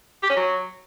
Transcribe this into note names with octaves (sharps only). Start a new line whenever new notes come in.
G4
C#4
F#3